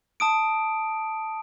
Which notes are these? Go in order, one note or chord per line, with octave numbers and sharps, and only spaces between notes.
A5 D#6 D7